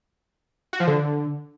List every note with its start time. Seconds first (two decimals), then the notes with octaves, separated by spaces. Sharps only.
0.73 F#4
0.80 F3
0.87 D3